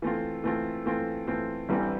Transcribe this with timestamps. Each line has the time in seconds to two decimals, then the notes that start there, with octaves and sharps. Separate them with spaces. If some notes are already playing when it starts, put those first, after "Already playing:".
0.02 E3 A3 C4 F4
0.44 E3 A3 C4 F4
0.86 E3 A3 C4 F4
1.27 E3 A3 C4 F4
1.69 A1 G2 E3 G3 C4